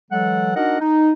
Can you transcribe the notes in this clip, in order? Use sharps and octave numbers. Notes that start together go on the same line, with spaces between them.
E3 F#3 G#3 A4 F#5
D4 D#4 F#4 A#4 D#5 F#5
D#4